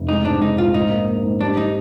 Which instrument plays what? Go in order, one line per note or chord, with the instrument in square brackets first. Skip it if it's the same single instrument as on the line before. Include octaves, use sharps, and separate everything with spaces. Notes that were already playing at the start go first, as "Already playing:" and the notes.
Already playing: [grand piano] F1
[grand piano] G#3 [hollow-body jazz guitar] D#4
[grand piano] G#2 [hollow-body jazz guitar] D4
[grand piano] G#2 [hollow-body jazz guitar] D#4
[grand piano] A#1 [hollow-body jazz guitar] F4
[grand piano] G#2 [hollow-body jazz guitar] D#4
[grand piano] A#3
A#3
G#2
[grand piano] G3 [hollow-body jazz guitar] D4
[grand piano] G3 [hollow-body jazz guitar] D#4